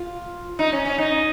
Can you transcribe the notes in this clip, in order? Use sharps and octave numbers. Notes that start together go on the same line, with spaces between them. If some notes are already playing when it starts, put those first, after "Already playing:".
Already playing: F4
D#4
C#4
C#4
D#4